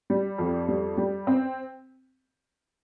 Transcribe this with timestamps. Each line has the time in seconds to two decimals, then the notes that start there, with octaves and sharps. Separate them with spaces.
0.10 G3
0.38 F2
0.68 G3
0.97 G3
1.27 C4